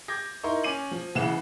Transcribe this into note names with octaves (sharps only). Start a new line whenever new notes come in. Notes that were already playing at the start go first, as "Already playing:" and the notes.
D6 G6 G#6 A#6
D#4 E4 A#4 C6 C#6
C#4 D6 D#7 F#7
F3
B1 C#3 E3 F#5 E7